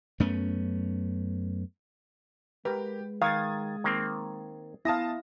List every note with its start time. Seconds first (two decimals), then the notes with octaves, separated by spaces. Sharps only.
0.20 F#2 A3 B3 C#4
2.65 G#3 G4 A#4 B4
3.22 D#3 F5 D#6 G#6 A6
3.84 D#3 A#3 C4
4.85 B3 E4 F5 A5 D#6 A#6